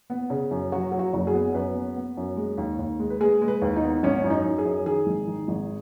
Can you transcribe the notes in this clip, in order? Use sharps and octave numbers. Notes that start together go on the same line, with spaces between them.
B3
C#3
F#2
F#3 F#4
F#3
F#4
F#1
G#4
B3
F#2 B4
B3
B3
F#2
G#3
D#2
D#2
G#3
B4
G#3 G#4
G#3
B4
D#2
D#4
B3
G#1 C#4
F#2
D#4
F#2
G#4
F#2
D#3 G#4
G#1
D#3
G#1